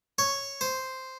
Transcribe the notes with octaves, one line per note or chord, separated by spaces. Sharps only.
C#5
C5